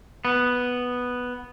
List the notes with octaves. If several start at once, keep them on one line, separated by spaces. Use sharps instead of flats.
B3